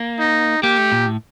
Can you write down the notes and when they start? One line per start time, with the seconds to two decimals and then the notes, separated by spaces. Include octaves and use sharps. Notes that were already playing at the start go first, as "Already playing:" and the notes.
Already playing: A#3
0.19 D#4
0.63 A#3 G4
0.78 A3
0.92 A#2
1.06 A2